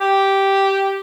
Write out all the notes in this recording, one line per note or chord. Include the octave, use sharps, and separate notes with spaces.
G4